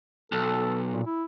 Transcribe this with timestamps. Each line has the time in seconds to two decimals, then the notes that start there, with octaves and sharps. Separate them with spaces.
0.32 B1 A4
0.93 A#2
1.06 E4